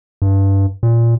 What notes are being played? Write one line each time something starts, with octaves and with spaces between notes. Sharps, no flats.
G2
A#2